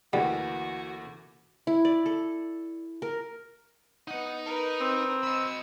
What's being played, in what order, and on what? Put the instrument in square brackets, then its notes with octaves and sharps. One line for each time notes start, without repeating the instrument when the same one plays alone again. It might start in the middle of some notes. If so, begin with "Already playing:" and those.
[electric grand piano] D2 E3 A#3 [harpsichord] G3 [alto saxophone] F#4 [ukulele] F#5
[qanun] E4
D5
A4
A#4
[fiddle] B3 F#5 [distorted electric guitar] D#4 D#5
[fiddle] A#4 B4
[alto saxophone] C4
[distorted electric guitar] D#5 B5 [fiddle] E6